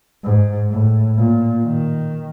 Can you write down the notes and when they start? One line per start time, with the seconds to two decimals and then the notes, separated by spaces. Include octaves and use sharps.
0.23 G#2
0.72 A2
1.18 A#2
1.66 D#3